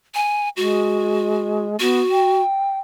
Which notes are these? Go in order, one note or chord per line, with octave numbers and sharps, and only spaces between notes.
G#5
G#3 F#4
B3 F#4
G5